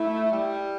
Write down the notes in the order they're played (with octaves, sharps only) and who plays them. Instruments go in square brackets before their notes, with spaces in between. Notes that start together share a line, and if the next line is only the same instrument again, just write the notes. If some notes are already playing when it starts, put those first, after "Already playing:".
Already playing: [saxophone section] A3 [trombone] E4
[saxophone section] G3